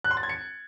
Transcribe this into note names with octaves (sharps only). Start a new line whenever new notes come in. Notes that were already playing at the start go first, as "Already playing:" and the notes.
F#6
C6
A6
G#6
C#7